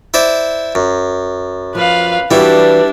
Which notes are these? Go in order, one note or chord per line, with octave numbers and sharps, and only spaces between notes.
E4 C5 D5
F#2
F3 B4 F5
E3 G3 D4 E4 F#4